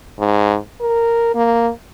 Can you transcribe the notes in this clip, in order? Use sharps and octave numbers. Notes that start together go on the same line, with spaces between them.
G#2
A#4
A#3